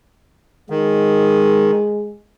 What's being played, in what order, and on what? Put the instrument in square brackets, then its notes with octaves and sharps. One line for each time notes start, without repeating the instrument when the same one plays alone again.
[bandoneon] D#3 [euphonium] G#3